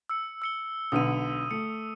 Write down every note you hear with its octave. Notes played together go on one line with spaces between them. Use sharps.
E6 C#7
E6 C#7 G7
B1 D3 B3 D#6 E6 D#7
A3 C#7